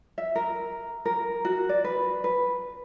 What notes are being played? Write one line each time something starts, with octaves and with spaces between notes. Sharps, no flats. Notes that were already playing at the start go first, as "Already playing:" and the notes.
E5
A#4
A#4
F#4
D5
B4
B4